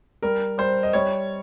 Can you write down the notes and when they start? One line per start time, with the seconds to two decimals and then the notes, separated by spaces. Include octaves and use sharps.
0.22 G3 A#4
0.58 G3 C5
0.83 D#5
0.93 G3 C#5